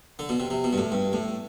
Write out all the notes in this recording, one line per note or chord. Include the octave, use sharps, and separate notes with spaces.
D3
B2
C3
C3
B2
G2
A2
G2
A2